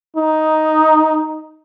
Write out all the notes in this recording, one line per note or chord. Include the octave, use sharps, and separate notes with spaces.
D#4